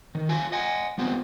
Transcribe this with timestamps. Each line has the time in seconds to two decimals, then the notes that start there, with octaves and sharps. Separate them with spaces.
0.15 D#3
0.29 F4 E5 G#5
0.52 D#5 F#5 G#5
0.98 G3 B3 C4 F4